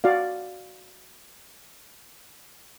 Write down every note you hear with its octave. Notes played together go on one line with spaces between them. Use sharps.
F#4 D5 F5